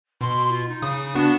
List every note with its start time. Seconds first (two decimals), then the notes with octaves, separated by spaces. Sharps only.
0.21 B2 C6
0.49 F4
0.68 D#4
0.82 C#3 D#6
1.15 B3 D4 F#4 A5